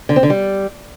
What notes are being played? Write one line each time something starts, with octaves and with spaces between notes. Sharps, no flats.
D3
C4
D3
G3